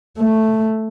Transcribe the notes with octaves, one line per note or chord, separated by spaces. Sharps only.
A3